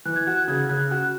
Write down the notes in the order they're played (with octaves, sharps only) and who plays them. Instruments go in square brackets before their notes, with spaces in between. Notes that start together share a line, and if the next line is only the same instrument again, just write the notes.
[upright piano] E3 [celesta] F#6
[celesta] G#6
[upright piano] F#4 [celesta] F#6
[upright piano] C#3 [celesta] G#6
[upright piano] C#3 [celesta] F#6
[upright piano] F#4 [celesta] F#6